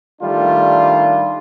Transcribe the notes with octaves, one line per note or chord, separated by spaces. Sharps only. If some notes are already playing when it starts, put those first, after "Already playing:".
D#3 G3 A3 D4 F4